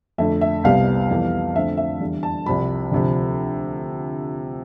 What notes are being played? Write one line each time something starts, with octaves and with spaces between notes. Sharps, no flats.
F2 D3 A3 E5
E5
C2 C3 G3 B3 F5
F2 E3 G3 B3
F2 D3 A3 C4 E5
E5
E2 D3 G3
A5
C2 C3 F3 B5
D2 C3 F3